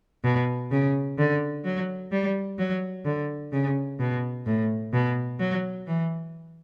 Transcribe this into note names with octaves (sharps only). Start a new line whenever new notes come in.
B2
C#3
D3
F#3
G3
F#3
D3
C#3
B2
A2
B2
F#3
E3